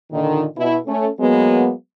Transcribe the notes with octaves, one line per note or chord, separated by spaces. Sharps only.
A#2 D3 D#3
B2 E4
A3 C#4
F#3 G#3 A#3 B3